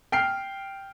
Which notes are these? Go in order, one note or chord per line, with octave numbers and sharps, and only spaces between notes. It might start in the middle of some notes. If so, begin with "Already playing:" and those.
G5 F6 C7